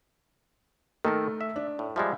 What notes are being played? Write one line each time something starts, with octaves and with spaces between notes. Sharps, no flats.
D#3 A3 A4 A#4
E5
D4
A2
F3 G3 G#3 E5 F5